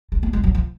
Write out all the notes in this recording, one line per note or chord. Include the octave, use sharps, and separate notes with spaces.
G#3
A#3
G#3
F#3
F3